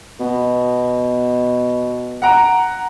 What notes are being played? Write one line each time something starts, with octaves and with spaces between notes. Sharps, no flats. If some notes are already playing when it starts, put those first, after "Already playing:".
B2
F#5 A#5 D7